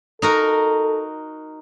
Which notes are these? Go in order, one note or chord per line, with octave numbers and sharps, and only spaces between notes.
D#4 F#4 A4 A#4